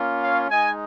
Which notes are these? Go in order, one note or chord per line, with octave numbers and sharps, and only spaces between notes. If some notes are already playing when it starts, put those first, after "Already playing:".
Already playing: A#3 C#4 F4
C#5 F5
G#3 D#4 D#5 G#5